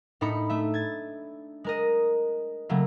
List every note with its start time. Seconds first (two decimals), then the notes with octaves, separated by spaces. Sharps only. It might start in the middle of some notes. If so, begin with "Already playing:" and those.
0.21 A2 D4 D#4 B5 C#7
0.50 A3 E5
0.74 G#6 A6
1.64 G#3 A#4 D#5
2.69 C#3 F#3 A3 A#3